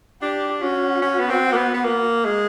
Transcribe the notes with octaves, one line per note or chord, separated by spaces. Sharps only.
D4 G4
C#4 F#4
C#4
B3
C4
A#3
B3
B3
A#3
G#3